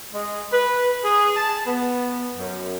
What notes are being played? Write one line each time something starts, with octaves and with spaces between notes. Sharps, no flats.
G#3
B4
G#4
A5
B3
F#2